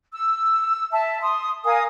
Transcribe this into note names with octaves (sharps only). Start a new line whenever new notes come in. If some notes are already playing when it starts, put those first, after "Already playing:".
E6
E5 A5
C6 D#6
A#4 F5 G#5 D#6